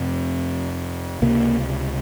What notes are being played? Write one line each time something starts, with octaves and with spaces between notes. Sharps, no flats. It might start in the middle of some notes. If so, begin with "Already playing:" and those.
Already playing: F2 C3 C4
C#2 C3 A#3